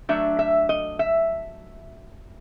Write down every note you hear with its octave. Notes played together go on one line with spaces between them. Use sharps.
F#3 A3 D4 E5
E5
D#5
E5